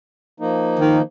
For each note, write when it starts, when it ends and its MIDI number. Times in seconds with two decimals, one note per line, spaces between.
0.40 1.02 53
0.40 1.02 58
0.40 1.02 63
0.80 0.99 51